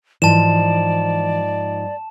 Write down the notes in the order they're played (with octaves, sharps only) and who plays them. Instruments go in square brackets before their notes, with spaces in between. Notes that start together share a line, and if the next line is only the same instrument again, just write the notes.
[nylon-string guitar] G#2 F3 [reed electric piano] E3 [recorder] D5 [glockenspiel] A5 E7